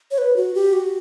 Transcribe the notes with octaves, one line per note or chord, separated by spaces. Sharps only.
C#5
B4
F#4
G4
F#4